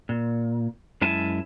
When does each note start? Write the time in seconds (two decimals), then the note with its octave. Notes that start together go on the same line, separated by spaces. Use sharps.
0.09 A#2
1.01 F#2 G#3 E4 E5 G#5 A5